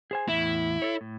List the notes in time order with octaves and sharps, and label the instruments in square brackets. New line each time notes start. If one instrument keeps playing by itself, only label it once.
[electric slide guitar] G#4 C5 G#5
[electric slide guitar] E2 A2 [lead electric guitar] E4
[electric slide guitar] A4 C#5
A2